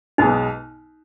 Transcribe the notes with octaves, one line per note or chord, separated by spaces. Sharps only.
B1 B2 G#3 B3 D#4